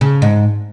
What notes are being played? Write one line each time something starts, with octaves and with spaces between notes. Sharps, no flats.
C#3
G#2